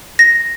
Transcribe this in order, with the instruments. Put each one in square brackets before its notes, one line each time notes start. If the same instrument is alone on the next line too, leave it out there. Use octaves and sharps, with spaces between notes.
[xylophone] A#6